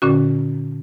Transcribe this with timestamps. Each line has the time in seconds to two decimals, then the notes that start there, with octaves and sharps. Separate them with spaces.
0.02 A#2 D3 C#4 F#4